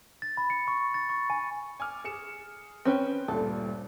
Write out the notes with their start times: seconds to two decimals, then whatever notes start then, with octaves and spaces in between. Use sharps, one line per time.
0.22 A6
0.37 B5
0.50 C#7
0.68 C#6
0.94 A6
1.09 C#6
1.30 G#5
1.80 G#5 D6 F6
2.04 G#4 C#7 E7
2.85 C4 C#4 B4 G5 F#6
3.28 D2 G2 A#2 A4